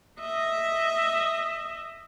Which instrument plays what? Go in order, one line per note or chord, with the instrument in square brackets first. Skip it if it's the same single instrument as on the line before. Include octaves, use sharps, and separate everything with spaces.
[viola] D#5 E5